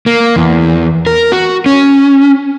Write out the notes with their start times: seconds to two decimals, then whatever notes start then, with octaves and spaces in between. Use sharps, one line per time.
0.06 A#3
0.36 E2
1.06 A#4
1.32 F#4
1.66 C#4